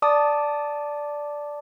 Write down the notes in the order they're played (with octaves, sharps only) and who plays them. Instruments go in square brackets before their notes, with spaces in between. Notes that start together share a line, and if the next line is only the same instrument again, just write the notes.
[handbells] D5 A5 D6 D#6